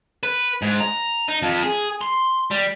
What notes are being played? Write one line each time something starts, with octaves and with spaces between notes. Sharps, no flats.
B4
G#2
A#5
D#4
F2
G#4
C6
G3